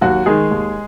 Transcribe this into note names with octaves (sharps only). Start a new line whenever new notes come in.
D#2 F#3 F#4
D#3 G#3 G#4
D#2